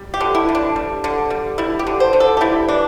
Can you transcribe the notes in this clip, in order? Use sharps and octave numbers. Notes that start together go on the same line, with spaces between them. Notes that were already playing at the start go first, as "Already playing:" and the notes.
Already playing: G3
G4
D3
E4
D3
D4
G3
D3
G3
G3 E4
G4
D3
C5
D3
A4
G4
G3 E4
E3 D4